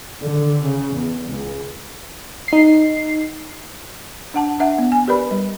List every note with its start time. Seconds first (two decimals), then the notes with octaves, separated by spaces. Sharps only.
0.21 D3
0.63 C#3
0.94 E2
1.26 C#2
2.48 D#4 C7
4.34 D4 F#5 A5
4.60 D4 E5 F#5
4.78 B3
4.92 G#5
5.08 G4 A#4 B4 D5 B5
5.31 G3